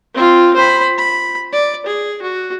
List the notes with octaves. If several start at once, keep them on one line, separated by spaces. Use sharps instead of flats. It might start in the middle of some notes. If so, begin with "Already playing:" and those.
C4 F4
C5 B5
B5
D5
G#4
F#4